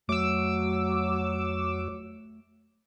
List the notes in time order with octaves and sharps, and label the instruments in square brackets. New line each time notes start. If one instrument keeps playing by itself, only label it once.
[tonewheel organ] F2 F#4 C#5 [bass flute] F#3 [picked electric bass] A3 [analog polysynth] D6 E6